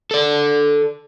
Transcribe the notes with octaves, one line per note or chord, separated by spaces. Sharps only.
A4 D5